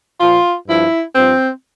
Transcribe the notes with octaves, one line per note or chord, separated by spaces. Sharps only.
A#2 F3 F4
G2 F3 E4
G2 F3 C4